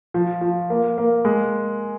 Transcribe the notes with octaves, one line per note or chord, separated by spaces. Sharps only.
F3
F3
A#3
A#3
G#3